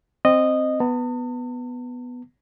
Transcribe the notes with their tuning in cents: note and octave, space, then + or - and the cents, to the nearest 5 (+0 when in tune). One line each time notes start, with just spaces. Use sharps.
C4 +0 D#5 -10
B3 +0 A5 +45